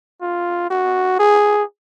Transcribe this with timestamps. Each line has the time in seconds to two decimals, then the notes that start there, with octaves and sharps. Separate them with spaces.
0.22 F4
0.70 F#4
1.19 G#4